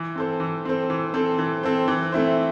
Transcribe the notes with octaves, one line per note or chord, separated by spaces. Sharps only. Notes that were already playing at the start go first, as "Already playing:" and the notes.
Already playing: E3
C4 A4 C5
E3
C4 A4 C5
E3
C4 A4 C5
E3
C4 A4 C5
E3
A3 C4 E4 C5